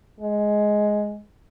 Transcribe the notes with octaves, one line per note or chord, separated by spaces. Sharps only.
G#3